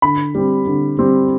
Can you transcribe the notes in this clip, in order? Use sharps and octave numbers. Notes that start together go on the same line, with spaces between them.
D3 B5
G3 C4
D3
G3 C4